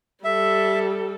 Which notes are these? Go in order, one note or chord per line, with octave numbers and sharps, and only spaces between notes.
G3 A4 E5